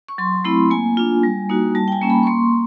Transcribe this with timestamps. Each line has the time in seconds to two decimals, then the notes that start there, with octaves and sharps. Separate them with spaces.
0.08 C#6
0.18 F#3 C6
0.44 A3 C4 E4 B5
0.70 A#3 G#5
0.97 D4 F4
1.23 G3
1.49 A#3 D#4 F#4
1.75 G3 A5
1.88 G5
1.92 G#5
2.01 A#3 C#4
2.10 B5
2.23 C#6
2.27 A#3 C6